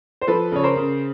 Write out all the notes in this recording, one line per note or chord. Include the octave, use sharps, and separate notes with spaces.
C5
F3 A4 B4
C#3 C#5
A#4 C5
C#3